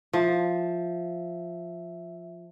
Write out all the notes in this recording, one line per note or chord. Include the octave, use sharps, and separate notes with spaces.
F3 E5